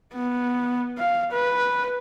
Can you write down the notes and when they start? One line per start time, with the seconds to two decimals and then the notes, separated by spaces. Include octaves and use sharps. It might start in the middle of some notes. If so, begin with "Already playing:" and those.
0.14 B3
0.98 F5
1.32 B4